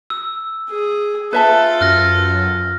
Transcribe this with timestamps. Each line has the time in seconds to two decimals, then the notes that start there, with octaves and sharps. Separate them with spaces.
0.10 E6
0.69 G#4
1.33 F4 A4 B4 E5 A5
1.81 F#2 F6 F#6 A#6